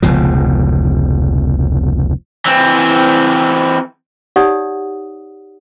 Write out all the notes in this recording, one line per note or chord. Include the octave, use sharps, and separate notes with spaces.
F1 C#2 B2 F3
E3 C4
D#4 G4 C#5 D5 F#5 D#6